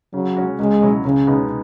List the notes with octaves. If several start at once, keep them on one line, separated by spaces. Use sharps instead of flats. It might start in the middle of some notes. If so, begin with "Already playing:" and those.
C#3 F#3
G#3 C#4 F#4
C#2 G#3
B2 F#3 C#4 E4
C#2 C#3
B2 G#3 B3 D#4